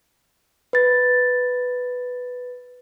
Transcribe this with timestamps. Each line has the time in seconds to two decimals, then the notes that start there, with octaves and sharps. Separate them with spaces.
0.73 B4 A6